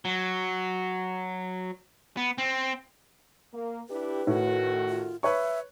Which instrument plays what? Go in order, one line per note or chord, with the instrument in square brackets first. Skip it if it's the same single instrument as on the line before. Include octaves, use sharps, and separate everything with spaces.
[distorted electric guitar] F#3
B3
C4
[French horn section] A#3
[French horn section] D4 E4 G4 [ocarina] B4
[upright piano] A2 [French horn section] D#3 A3 F#4
[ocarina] F4
[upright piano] B4 C#5 C#6 [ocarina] E5